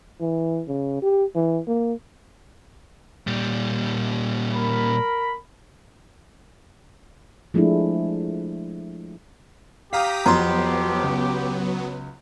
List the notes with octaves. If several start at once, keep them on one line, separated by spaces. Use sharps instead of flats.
E3
C#3
G4
E3
A#3
A#2 G3
A#4 B5
F3 G#3 A3 D4 E4
G4 F5 A#5 D#6 B6
F2 F#3 B3 A#5 C6
C#2